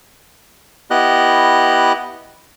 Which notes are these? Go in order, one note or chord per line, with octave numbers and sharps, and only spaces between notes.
B3 E4 G4 D#5 F#6